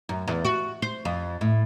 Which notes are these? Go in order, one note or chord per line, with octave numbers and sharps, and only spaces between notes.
F#2
E2
F#4
C5
F2
A2